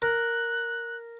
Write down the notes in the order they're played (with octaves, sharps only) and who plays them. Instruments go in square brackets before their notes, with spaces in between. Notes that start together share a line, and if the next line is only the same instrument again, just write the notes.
[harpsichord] A#4 [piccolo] F#6